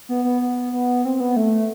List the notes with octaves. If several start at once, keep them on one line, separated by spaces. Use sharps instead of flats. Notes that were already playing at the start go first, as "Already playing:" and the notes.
B3
B3
B3
B3
C4
B3
A3